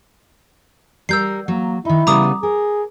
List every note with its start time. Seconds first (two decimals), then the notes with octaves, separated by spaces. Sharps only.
1.09 G3 A#4 E6 G6 C7
1.48 F#3 A#3
1.85 D#3 D#4 E4
2.07 C#3 G3 B3 A#5 D6 D#6
2.43 G#4 A#4